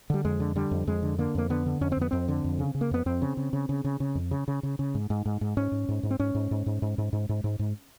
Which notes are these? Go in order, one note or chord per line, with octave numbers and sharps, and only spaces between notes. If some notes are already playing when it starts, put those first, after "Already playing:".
D3 G3
F2 G#3
D3
D3 G3
F2
F2 G#3
D3
D3 A#3
F2 A#3
D3 B3
D3
F2 C#4
C4
F2 B3
F2 C4
D3
F2
C#3
C#3
A#3
F2 B3
F2 C4
C#3
C#3
C#3
C#3
C#3
C#3
F2
C#3
C#3
C#3
C#3
G#2
G#2
G#2
G#2
G#2 C#4
G#2
G#2
G#2
C4
G#2 C#4
G#2
G#2
G#2
G#2
G#2
G#2
G#2
G#2
G#2